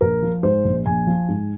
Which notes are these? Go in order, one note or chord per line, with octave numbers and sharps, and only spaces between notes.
A#1 A#4
F3
G#2 C5
A#1
A#1 G#5
F3
G#2